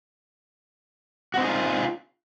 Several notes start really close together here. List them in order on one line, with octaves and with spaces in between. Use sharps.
F#4 C4 D#4 G#4 F4